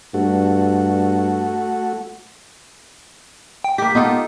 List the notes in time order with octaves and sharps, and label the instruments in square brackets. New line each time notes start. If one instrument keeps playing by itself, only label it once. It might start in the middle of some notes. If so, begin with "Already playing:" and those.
[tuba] G2 [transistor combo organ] A3 F#4
[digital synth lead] G5
[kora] A#3 G4 [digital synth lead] B6
[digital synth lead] B3 [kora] D#4 F4 A4